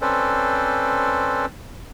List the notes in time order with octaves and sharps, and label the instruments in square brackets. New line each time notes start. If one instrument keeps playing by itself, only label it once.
[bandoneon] C4 C#4 A4 B4 C5 D5